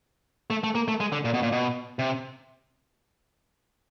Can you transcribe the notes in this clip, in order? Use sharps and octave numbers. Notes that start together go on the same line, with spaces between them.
A3
A3
A#3
A3
G#3
D3
A#2
B2
A#2
B2
C3